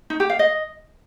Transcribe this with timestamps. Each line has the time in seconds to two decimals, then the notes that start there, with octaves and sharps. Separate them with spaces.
0.10 D#4
0.20 G4
0.30 F5
0.39 D#5